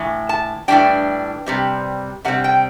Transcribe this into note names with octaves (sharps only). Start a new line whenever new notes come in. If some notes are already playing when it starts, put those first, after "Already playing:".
Already playing: A2 E3
A5
A2 E3 G3 D4 G5
C3 G3 C4
C3 G3 C4 F#5
G5